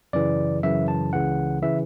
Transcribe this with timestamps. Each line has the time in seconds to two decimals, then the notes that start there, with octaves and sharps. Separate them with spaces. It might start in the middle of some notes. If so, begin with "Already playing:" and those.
0.13 F#2 C#3 E3 D5
0.63 F#2 C#3 E3 E5
0.88 A5
1.13 C#2 C#3 E3 F#5
1.62 C#3 E3 E5